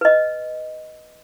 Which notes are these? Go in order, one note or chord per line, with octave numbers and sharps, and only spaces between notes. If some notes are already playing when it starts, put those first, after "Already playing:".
B4 D#5